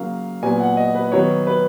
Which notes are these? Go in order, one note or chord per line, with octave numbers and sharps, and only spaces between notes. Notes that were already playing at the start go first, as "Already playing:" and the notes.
Already playing: C#3 F#3 A#3 F5
A#2 F#3 B3 G#5
F#5
D#5
B4
D#3 F#3 B3 C#5
B4